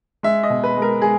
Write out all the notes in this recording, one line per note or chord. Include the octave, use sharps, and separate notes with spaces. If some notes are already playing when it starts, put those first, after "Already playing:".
G#3 E5
D#5
B2
B4
G#3
A#4
G#3 G#4